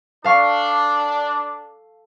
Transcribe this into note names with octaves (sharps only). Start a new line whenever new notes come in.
D4 A4 F5 C#6